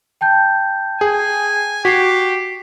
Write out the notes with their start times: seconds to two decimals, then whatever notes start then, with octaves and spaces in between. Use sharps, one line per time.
0.21 G5 A5 G6
1.01 G#4 G#5
1.85 F#4 G4 B6 C7